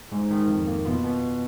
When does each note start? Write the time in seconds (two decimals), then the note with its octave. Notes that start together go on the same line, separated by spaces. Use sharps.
0.12 G#2
0.31 D#3
0.48 F2
0.67 A#3
0.85 B2 F4
1.04 B2